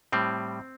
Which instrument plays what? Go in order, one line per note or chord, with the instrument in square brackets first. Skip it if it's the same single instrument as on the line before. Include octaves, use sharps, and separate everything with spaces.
[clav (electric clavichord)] A2 G3 C4